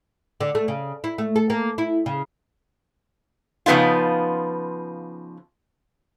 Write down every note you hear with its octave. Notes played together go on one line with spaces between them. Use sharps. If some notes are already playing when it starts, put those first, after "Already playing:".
D3
A3
C#3
E4
A3
A4
A#3
E4
C#3
C#3 F3 B3 D#4 F4